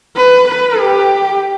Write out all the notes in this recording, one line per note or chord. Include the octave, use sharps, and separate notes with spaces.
B4
B4
G4